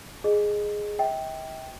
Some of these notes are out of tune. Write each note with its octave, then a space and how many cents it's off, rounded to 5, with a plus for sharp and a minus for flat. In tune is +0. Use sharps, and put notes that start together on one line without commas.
G#4 +0 D#5 -15
E5 -45 G5 +0